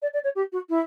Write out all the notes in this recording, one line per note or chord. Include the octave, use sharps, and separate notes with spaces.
D5
D5
C#5
G4
F#4
E4